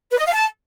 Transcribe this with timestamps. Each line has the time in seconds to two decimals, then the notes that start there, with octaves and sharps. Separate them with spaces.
0.11 B4
0.19 D#5
0.26 F5
0.33 A5